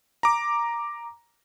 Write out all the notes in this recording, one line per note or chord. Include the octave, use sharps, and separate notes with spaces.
A#5 D6